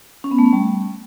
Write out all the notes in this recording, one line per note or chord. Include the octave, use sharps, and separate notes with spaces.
C#4
B3
A3
C#4
G3